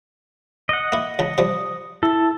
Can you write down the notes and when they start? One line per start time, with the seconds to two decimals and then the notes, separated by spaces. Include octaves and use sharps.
0.69 D#5 F#5
0.92 A#3 E4
1.19 C#2 C#3
1.38 C3 F3 G3
2.03 E4 A4